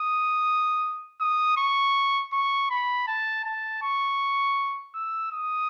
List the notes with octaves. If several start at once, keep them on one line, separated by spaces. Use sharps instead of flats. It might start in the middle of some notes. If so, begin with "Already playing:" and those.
Already playing: D#6
D#6
C#6
C#6
B5
A5
A5
C#6
E6
D#6